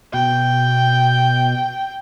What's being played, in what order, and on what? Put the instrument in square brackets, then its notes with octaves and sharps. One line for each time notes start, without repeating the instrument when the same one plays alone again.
[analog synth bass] B2 [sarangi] G5